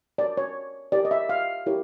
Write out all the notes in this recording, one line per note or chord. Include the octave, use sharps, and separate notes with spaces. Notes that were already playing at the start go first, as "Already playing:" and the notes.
F#4 A#4 C#5 D5
C#5
E4 G4 A#4 C#5 D5
D#5
E5
F5
E4 G4 A#4 C#5